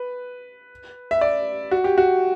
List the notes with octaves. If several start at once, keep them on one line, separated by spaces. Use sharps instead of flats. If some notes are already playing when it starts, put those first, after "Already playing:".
Already playing: B4
E5
D5
F#4
G4
F#4